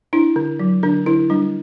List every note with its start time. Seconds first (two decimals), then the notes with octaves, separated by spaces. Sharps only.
0.13 D4 E4
0.36 D3
0.59 F#3
0.83 D3 D4
1.06 D3 E4
1.30 G3 D4